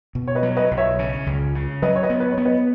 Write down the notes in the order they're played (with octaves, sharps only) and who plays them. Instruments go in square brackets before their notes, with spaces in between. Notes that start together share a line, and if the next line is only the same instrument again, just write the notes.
[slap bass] B2
[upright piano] C#5
B4 D#5
[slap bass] F#3
[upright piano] B4 D#5
[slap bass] B1
[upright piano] C#5 E5
[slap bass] C#3
C#2
C#3
[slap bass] F#3 [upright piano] B4 D#5
[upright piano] C#5
B4 D#5
[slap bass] B3
[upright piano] B4
C#5
[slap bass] B3
[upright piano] B4 D#5